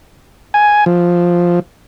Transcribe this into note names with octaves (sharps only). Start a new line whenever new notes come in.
G#5
F3